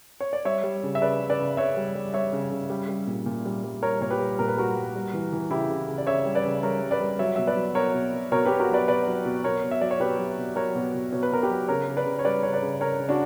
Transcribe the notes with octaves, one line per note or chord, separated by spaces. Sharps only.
C#5
D5
G3 C#5 E5
G3
C#3
E5
C#3 B4 D5
C#3
B4 D5
C#3
C#3 C#5 E5
G3
G3
G3 C#5 E5
C#3
C#3
G3
G3
A#2
A#2
G3
G3
G3 A#4 C#5
A#2 C#5
G4 B4
G3
A#2 A#4
B4
G3 F#4 A#4
G3
G3
E3
E3
C#3 E4 G4
C#3
C#3
D5
C#3 C#5 E5
G3
B4 D5
C#3
G3 A#4 C#5
G3
B4 D5
G3
F#3 C#5 E5
B2 E5
B4 D5
F#3
B2 A#4 C#5
B2
B2
B2 A#4 C#5
B2 G4 B4
F#4 A#4
F#3 B4 D5
B2 B4 D5
F#3
B2
B2 A#4 C#5
B2
E5
F#3 D5
C#5
B2 G4 B4
F#3
B2
F#3 A#4 C#5
B2
B2
B2 C#5
B4
B2 A#4
G4 B4
F#3
C#3 A#4 C#5
C#3
B4 D5
C#3
C#5
G3 B4 D5
C#3 C#5
B4 D5
C#3
C#3 A#4 C#5
C#3
D4 F#4